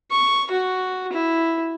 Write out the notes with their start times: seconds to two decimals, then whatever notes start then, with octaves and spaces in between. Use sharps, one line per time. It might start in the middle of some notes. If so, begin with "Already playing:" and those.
0.11 C#6
0.51 F#4
1.13 E4